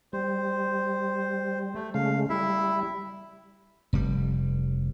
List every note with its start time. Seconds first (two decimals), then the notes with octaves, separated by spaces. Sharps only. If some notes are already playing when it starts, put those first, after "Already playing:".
0.13 G3 C5
1.75 A3
1.94 C#3 G#3 A3 F5
2.29 G3 E4 E5
3.93 F1 G3